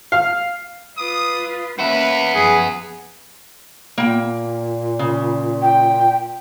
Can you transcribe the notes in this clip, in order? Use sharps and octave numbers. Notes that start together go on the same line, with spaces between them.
F5
F4 B4 D#6
A#3 B3 C#4 B4 E5
F#2 F3 G#4 B4
A#2 A#3 G5
C#3
G5